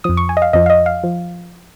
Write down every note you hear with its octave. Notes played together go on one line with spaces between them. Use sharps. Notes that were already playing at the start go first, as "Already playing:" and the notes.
F2 F3 D#6
C#6
G#5
D#5
F5
F2 F3 D#5
F5
D#5
F5
F3